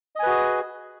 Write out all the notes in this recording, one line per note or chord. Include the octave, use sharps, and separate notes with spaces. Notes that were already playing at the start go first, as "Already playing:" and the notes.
F#4 G#4 B4 D#5 G#5